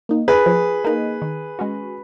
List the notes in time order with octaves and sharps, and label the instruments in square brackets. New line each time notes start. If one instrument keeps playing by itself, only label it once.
[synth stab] A#3 D#4
[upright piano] G#4 B4
[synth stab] F3
A#3 D#4
D#3
G#3 C#4 F#4